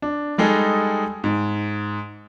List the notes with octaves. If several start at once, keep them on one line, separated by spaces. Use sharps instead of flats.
D4
G3 G#3 D#4 G#4 A4
G#2